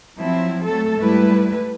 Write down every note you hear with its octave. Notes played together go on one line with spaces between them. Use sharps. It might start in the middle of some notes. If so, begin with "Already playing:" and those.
F3 F#3 C4 E4
F#3 A3 A4
G#2 G3 A3 E4 B4